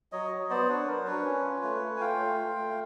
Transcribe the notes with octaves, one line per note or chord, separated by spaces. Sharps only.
F#3 C#5 D#5
F#3
B3 C5 D5
D4 B4 C#5
F#3 A#4 C5
D4 B4 C#5
C#4
F4
A3
A3
G#5
F4 F5 G5
A3
F4
A3